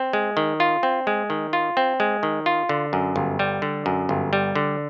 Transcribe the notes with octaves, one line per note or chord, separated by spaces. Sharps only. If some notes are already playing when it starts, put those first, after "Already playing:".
Already playing: C4
G#3
D#3
F4
C4
G#3
D#3
F4
C4
G#3
D#3
F4
D3
F#2
G1
G3
D3
F#2
G1
G3
D3